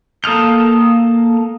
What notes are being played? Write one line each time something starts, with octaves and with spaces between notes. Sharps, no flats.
A#3 A4 D#6 F6 G6